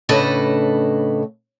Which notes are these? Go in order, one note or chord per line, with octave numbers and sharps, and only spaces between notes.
A2 C#3 D4 A4 B4 D#5